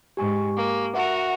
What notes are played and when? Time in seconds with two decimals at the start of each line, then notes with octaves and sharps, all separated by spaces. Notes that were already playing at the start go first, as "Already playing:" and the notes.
0.17 G#2 G4 G#5 C#6
0.57 A#3
0.95 F#4 A#4 E5 F#5